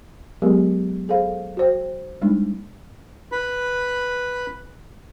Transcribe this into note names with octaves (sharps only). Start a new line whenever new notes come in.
F#3 G#3 B3 G4 G#4 A#4
G#4 A4 C5 F5
F#4 C5 G5
G3 G#3 A#3 D4 D#4
B4 B5